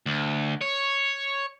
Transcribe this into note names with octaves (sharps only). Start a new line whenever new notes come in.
D2
C#5